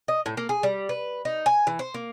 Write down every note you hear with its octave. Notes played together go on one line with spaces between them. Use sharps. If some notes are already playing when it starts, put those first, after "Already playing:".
D#5
A2
A#3
G#4
G3
B4
D#4
G#5
E3
C5
A#3